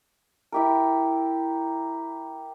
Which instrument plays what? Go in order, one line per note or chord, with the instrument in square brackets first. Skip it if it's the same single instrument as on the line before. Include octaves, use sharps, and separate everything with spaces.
[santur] E4 G4 A#4